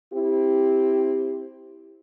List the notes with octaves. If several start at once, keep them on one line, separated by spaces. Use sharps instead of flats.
C4 E4 G4